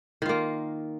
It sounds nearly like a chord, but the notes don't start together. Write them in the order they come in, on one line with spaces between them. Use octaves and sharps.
D#3 F4 A#3